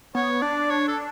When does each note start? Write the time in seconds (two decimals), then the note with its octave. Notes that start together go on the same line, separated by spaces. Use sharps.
0.15 B3 C#5
0.42 D4 D5
0.70 C#5
0.88 A4